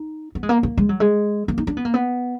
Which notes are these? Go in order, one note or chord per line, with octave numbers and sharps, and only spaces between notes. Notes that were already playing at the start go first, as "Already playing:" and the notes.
Already playing: D#4
B3
G#3
A#3
A#3
G#3
F#3
G#3
A#3
D#4
D4
B3
A#3
B3